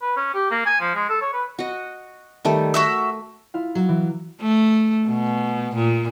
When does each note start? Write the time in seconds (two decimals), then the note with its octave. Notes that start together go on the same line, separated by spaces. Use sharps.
0.02 B4
0.17 C#4
0.34 G4
0.51 A#3
0.66 G#5
0.80 F3
0.95 G#3
1.10 A4
1.22 C#5
1.33 B4
1.59 F#4 D#5
2.45 D#3 G3 A3
2.74 A3 F#4 E5 E6
3.54 E4 F4 F5
3.75 F#3
3.89 E3
4.41 A3
5.07 B2
5.75 A#2